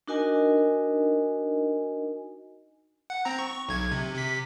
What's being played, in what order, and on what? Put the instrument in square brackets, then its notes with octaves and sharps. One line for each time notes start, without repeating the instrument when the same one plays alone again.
[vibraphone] D4 D#4 F#4 A#4 D#5 G#5
[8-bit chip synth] F#5
C4 A#5
C#6
B1 G#6
C3
C3 B6